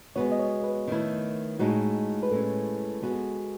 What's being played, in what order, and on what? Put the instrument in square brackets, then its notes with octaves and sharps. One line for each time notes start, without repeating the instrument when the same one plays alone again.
[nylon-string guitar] G#3 B3 F#4 [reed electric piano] C#5
[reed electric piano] D#5
C#5
B4
[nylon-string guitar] D#3 A3 E4
A2 G#3 D#4 F#4
[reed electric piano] B4
[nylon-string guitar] A2 G#3 C#4 [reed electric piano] A4
[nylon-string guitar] G#3 B3 F#4